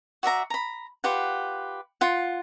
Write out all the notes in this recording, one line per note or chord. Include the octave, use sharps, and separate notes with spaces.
F#4 D5 E5 A#5
A#5 B5
F4 G4 B4 F#5
F4 F#5